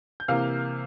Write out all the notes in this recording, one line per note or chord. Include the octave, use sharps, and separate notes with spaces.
G6
C3 E3 A#3 F5 F6